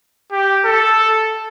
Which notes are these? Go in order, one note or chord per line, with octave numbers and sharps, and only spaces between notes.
G4
A4